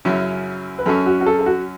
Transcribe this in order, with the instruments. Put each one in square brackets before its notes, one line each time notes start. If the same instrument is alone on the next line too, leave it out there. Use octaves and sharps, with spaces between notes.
[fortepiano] F#2 C#3 F#3 C#4 E4
[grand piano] B4
[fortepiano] F#2 F#3 C#4 [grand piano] A4
[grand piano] F#4
F#4
A4
A4
F#4